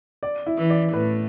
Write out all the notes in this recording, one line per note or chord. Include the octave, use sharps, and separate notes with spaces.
D5
E4
E3
D5
A2 B4